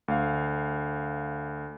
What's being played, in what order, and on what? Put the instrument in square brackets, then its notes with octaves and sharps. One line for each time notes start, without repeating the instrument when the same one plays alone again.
[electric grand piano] D2 F5